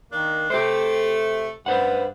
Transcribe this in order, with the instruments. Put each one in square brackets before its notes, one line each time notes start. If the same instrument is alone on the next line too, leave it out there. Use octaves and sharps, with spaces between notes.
[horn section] D#3 A#3 D4
[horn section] C3 A3 [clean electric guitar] G4 C5
[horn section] G2 [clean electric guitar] B4 C5 F#5